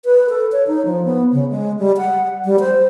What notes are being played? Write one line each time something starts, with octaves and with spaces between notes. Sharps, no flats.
B4
A4
C#5
D#4
F3
B3
C#3
G#3
G3
F#5
G3
C5